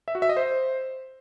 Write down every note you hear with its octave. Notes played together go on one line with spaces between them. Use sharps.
E5
F#4
E5
D#5
C5